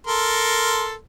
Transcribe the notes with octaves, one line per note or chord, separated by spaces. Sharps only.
A4 A#4 C6